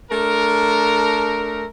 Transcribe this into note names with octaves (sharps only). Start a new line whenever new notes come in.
A3 D4 A#4